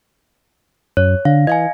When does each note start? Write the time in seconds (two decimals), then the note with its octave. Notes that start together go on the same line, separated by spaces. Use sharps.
0.97 F#2 C#5
1.25 D3 F5
1.47 E3 D#5 F5 G#5